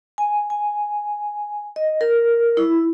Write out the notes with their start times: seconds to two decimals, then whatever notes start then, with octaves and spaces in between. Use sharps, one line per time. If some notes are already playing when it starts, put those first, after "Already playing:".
0.18 G#5
0.50 G#5
1.76 D#5
2.01 A#4
2.57 E4